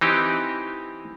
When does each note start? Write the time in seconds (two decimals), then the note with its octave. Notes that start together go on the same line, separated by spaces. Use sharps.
0.01 E3 C4 D#4 G4